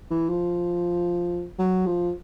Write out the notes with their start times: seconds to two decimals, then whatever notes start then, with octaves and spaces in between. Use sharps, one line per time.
0.11 E3
0.29 F3
1.59 F#3
1.86 F3